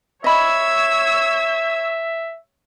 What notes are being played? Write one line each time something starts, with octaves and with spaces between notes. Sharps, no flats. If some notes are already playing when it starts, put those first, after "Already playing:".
C#5 D#5 E5 B5 E6 G#6